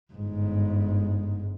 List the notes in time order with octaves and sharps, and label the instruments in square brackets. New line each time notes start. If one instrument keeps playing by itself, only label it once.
[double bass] G1 G#2